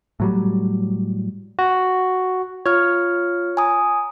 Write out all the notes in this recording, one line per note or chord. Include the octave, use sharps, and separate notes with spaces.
A2 F#3 G3
F#4
F4 C#5 F6
G#5 A#5 D#6